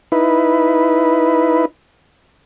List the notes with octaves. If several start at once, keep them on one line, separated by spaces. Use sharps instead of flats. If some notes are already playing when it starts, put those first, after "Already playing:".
D#4 E4 B4